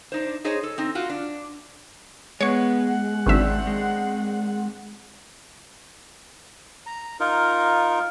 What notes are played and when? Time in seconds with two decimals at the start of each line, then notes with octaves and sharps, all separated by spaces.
0.12 D4 D#4 C5
0.44 D#4 G#4 C5 C#5 D#5
0.63 A4
0.78 C4 D#4
0.95 F4 F#4 F5
1.10 D4
2.41 G#3 B3 C#5 C#6
2.88 F#5
3.26 G#1 D#3 F#3 C4 D4 E5
3.67 G#3
6.86 A#5
7.20 D#4 F4 A#4